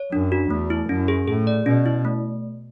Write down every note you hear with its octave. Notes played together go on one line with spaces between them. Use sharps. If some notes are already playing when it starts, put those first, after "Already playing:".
Already playing: C#5
F#2 D4
F#4
E2 A3
E4
F#2 C#4
G#4
A2 G#4
D5
B2 C#4
E4
A3